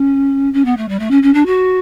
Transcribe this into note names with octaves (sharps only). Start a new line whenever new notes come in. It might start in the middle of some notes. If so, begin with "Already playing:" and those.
Already playing: C#4
C#4
B3
A3
G3
A3
C#4
C#4
D4
F#4